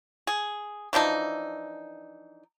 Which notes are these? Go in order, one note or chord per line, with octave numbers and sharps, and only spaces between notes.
G#4
E3 F3 D4 D#4